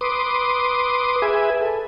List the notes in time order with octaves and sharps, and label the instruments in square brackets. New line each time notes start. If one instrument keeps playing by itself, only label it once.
[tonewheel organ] B4 C6 D6 D#6
G#4 B4 E5 G#5
A4